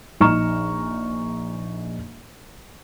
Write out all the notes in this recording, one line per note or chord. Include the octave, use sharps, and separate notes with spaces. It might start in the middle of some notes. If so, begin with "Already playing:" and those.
A#1 D#4 A#5 C#6 F6 E7